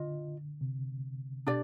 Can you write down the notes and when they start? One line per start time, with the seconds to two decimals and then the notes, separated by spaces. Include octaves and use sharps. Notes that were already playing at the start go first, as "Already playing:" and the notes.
Already playing: D3 F4 D#5
0.61 C3
1.46 B2 D4 G4 D5